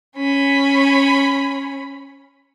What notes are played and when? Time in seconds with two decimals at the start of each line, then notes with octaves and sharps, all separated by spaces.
0.16 C#4 B5